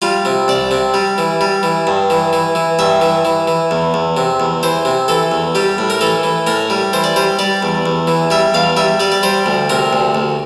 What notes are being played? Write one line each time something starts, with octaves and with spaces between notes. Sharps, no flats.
G3 F4
C3
C2 D5
C3
G3
E3
G3
E3
G2
E3
E3
E3
G2 E5
E3
E3
E3
E2
E2
C3
E2
E3 C5
C3
E3 A4
E2
G3 G4
A2
A#4
E3 A4
E3
A2 A#4
G3
E3 C5
D5
G3 C5
G3 D5
E2
E2
E3
G3 E5
E2 F5
G3 E5
G3 D5
D5
G3 C5
D2
C3 A#4
D2
D2